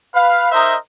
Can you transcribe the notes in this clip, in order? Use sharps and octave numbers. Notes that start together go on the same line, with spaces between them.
B4 F5
D#4 A#4 C5 D#5 E5